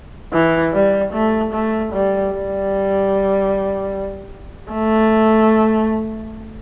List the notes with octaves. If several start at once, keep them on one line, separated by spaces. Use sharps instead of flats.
E3
G3
A3
A3
G3
G3
A3